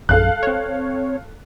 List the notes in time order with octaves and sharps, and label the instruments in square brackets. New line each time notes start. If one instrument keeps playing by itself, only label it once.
[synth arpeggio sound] A#1 F#2 [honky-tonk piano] A4 F5 F#6
[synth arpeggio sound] C4 C#5